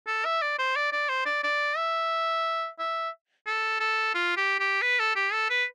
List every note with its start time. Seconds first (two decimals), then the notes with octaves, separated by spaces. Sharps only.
0.07 A4
0.25 E5
0.42 D5
0.58 C5
0.76 D5
0.92 D5
1.09 C5
1.26 D5
1.44 D5
1.77 E5
2.79 E5
3.46 A4
3.80 A4
4.14 F4
4.37 G4
4.59 G4
4.82 B4
4.99 A4
5.16 G4
5.32 A4
5.50 B4